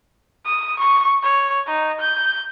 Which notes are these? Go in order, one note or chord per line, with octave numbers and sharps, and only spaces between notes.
D#6
C#6
C#5
D#4
G6